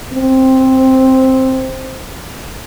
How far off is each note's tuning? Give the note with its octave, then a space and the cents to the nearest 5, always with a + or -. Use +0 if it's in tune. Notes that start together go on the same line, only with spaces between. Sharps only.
C4 +5